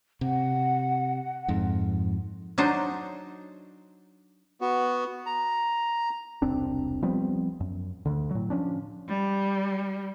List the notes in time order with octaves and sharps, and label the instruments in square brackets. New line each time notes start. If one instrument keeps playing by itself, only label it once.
[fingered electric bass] C3 [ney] F#5
[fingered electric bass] F2 G#2
[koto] F#3 D4 D#4 C5
[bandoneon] B3 F#4
A#5
[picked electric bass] E1 C2 C4 D4
F3 G3 B3 C4
F#2
D2 D3
A2 F#3
F3 C#4 D4
[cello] G3